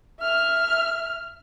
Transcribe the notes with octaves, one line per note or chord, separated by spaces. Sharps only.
E5 F6